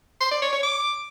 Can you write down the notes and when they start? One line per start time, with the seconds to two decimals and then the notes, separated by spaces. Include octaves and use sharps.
0.20 C6
0.31 D5
0.42 C#5
0.52 C#5
0.63 D6